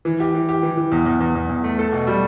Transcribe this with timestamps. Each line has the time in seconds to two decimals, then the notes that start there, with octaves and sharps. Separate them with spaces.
0.05 E3
0.20 G4
0.34 E3
0.49 G4
0.63 E3
0.77 E3
0.92 E2
1.06 E2
1.20 E2
1.35 E2
1.49 E2
1.64 A3
1.79 A4
1.93 B2
2.07 G3